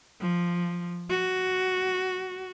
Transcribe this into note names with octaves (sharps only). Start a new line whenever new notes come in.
F3
F#4